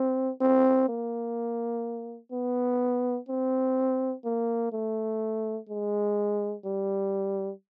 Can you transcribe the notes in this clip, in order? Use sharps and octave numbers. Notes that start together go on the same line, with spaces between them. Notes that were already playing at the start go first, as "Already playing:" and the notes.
Already playing: C4
C4
A#3
B3
C4
A#3
A3
G#3
G3